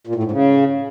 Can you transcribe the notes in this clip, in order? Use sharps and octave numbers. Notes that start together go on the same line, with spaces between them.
A#2
A2
G#2
C#3